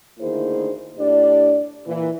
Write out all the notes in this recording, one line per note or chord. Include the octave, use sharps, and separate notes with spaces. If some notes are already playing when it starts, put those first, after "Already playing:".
D2 D#3 A#3 E4 G#4 C5
A2 D4 G4 D5
A#2 E3